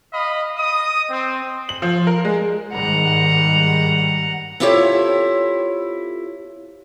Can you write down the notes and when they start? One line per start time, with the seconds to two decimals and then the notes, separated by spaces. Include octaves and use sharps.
0.12 D#5 F5 B5
0.56 D#5 D#6
1.09 C4
1.69 F#7
1.82 F3
2.07 A#4
2.25 G#3
2.72 G#2 D#3 G3 F#5 A#5
4.60 C4 E4 F4 G4 A4 C#5